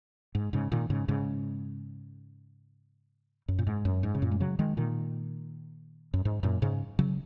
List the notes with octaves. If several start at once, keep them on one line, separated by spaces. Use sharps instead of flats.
G#2
G#2 C#3
A#2 D#3
G#2 C#3
G#2 C#3
F#2
A#2
G#2
F#2
G#2
C#3
F#2 A#2
G#3
C#3 F#3
D#3 G#3
A#2 D#3
F#2
G#2
F#2 A#2
G#2 C#3
C#3 F#3